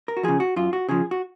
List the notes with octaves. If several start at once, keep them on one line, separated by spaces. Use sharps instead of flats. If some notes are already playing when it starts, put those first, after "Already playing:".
A#4
F#4
C#3 F3 G#4
F#4
F#2 F4
F#4
C#3 F3 G#4
F#4